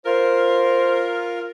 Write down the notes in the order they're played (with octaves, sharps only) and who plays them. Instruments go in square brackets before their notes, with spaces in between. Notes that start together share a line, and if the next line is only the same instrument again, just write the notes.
[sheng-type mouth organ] F4 [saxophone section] A#4 [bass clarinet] C5